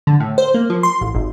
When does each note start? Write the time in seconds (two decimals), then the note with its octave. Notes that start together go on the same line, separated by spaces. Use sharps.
0.07 D3
0.20 A2
0.38 C5
0.54 A#3
0.70 F3
0.83 C6
1.01 A1
1.15 G#1